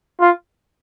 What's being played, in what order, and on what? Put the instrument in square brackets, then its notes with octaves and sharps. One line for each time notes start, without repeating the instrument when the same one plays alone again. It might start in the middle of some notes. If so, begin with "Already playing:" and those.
[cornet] F4